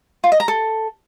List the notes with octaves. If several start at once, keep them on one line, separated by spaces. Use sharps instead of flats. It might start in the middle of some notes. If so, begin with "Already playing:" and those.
F4
D#5
A#5
A4